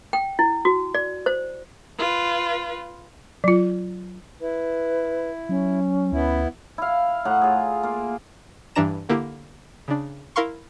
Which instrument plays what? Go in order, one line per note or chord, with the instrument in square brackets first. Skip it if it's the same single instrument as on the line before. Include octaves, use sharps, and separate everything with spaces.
[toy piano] G5
E4
F#4
D5
C5
[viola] F4 B4
[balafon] F#3 F4
[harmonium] E4 [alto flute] B4
[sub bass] F#3 [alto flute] C#4
[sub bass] D2 [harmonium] B3 E4
[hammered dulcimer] E4 F5
A2 F#5 A#5
F4 G#4
A#3 F4
[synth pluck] G2 E3 D4 A#5 E7
D3 A#3 E4 G4
C#3 D4
E4 A#4 F5 C6 C#6